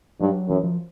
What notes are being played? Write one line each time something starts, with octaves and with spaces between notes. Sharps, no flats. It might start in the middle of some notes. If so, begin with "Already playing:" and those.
G2 F#3
F#2 E3
F3